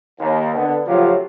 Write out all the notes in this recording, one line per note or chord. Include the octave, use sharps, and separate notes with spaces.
D#2
D3 B3
C#3 F3 F#3 A3 F4 G4